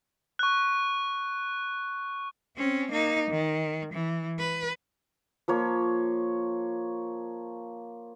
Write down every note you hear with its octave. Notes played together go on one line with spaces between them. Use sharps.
C#6 F#6
C4 C#4
A#3 D#4
D#3
E3
B4
F3 A#3 C#5